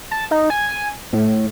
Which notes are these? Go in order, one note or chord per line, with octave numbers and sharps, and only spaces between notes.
A5
D#4
G#5
A2